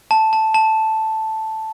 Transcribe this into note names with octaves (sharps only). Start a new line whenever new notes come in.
A5
A5
A5